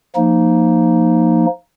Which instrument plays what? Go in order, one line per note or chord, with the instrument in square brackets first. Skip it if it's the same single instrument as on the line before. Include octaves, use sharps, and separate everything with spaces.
[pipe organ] F3 A#3 D#4